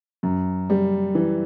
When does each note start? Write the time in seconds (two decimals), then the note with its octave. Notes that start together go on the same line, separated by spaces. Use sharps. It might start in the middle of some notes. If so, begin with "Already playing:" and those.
0.23 F#2
0.70 G3
1.15 E3